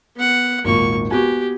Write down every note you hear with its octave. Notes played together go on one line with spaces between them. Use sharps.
B3 F#5
G#1 D#2 A#2 A#3 C#6
B3 F#4 G4 G#5